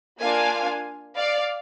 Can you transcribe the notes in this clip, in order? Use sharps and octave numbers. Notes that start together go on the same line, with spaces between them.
A#3 D4 F4 F5 G#5
D5 F5